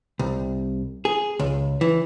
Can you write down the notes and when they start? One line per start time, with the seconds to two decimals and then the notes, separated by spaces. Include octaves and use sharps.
0.19 C2
1.05 G#4
1.39 C#2
1.81 E3